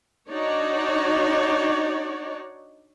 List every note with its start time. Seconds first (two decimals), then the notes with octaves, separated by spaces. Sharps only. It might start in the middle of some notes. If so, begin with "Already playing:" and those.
0.30 D4 D#4 F#4 C#5 D5